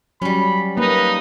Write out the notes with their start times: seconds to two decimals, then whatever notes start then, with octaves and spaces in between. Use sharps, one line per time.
0.22 F#3 G3 C#4 B5
0.77 A#3 D#4 B4